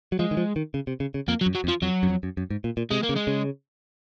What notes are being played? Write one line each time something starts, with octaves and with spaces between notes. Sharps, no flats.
F#3
F3 G#3
D#3
F3
D#3
C#3
C3
C#3
C#3
F2 A#3
F#3
F#2
F#3
F2
F3
F2 F#3
F#2
F2
F#2
F#2
G#2
A#2
A#2
C3 G#3
A#3
C#3
G#3
C#3